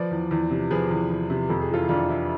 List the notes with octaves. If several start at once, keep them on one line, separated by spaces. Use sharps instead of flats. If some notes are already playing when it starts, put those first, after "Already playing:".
Already playing: F3 B4 D5
E2
E2
C3
F3 G#4 B4
E2
E2
C3
F2 A4
G#4
E3 F4 A4
F2 D4 F4
E3 E4